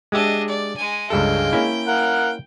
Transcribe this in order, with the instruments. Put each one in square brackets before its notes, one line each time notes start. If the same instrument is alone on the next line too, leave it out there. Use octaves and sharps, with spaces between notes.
[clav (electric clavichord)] G#3 G4 E5 [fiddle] D4 D#5
[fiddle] D5
G#3 G#5
[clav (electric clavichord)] C#2 G2 A4 [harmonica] D3 G#3 F5 [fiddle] G5
[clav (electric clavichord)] A#3 C#4 E4
[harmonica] A#4 F5 F#5